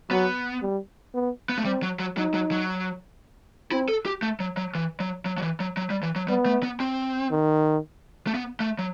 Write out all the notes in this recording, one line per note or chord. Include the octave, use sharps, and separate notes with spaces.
F#3 B3
G3
B3
B3
A3
G3 C4
F#3
F#3
F#3 D#4
F#3
F#3
C4 E4
A4
G4
A3
F#3
F#3
E3
F#3
F#3
F#3
E3
F#3
F#3
G3
E3
F#3
G3 B3
A3
B3
C4
D#3
A3
B3
A3
F#3